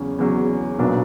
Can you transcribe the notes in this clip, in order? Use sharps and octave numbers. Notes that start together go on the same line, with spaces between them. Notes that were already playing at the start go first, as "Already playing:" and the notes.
Already playing: E2 C#3 F#3 C#4
E2 C#3 F#3 C#4
B1 A#2 F#3 B3 D4